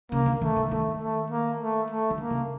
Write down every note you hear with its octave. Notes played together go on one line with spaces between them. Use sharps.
C#3 A#3
D3
D#3 A3
D3
D#3 A3
A3
A#3
A3
A3
D3
A#3
C#3